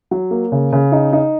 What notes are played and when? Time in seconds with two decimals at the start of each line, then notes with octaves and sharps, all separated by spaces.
0.11 F#3
0.31 A#3
0.52 C#3
0.72 C#3
0.92 D#4
1.13 D#4